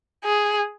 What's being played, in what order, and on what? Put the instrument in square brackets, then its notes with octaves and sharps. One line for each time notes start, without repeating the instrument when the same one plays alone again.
[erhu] G#4